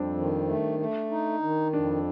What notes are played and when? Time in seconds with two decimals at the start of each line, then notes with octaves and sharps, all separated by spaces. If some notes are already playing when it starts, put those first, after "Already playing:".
Already playing: F2 G3 C4 D4
0.17 D#3
0.48 A3
0.80 A3
1.11 D#4
1.42 D#3
1.73 F2 D4